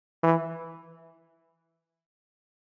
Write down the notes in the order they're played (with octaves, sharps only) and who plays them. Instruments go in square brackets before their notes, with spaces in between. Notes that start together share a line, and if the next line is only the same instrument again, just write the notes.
[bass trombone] E3